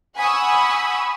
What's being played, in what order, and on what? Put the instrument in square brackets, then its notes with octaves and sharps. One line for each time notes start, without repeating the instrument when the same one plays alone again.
[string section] F#5 G#5 B5 C#6 D#6 E6